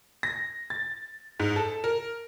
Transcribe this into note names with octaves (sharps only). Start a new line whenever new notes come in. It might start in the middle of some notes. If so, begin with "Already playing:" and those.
A#6
A6
G#2
A4
A#4